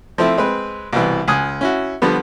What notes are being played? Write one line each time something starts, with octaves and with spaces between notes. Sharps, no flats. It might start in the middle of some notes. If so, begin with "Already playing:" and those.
F3 A3 C4 E4
G#3 C4 B4
C2 B2 E3
C#2 G#5 D#6 F#6
C#4 E4 F#4
D3 F3 G3 B3